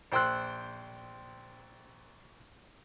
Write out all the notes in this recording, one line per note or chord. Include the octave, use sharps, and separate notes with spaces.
A#1 C5 G5 C6 E6 F#6